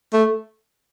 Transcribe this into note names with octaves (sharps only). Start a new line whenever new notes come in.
A3